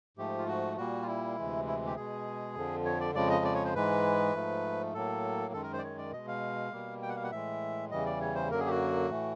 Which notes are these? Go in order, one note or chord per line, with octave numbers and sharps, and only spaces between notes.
G#2 F3 A3 G4
F4
F#4
A#2 G3 A#3 F#4
F4
E4
D2 C3 E3 G#3
E4
G4
B2 G#3 G#4
F2 D3 F3
C#5
D5
F2 C#3 F3 G#3 D5
D#5
D5
C#5
C5
G#2 E3 G#3 B4
G#2 F3 A3
A2 F#3 A#3 A4
F#2 D#3 G#3 A4
A#4
C5
D5
C#5
D5
B2 G#3 D#5
F5
B2 G3 A#3
G5
F#5
F5
F#5
A2 E3 G#3 E5
E2 C#3 E3 G3 D#5
D5
C#5
C5
F#2 D3 F#3 A#3 A#4
G#4
G4
F#4
A2 E3 A3